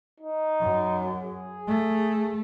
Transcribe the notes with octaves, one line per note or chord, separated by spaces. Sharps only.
D#4
F#2
G#4
A3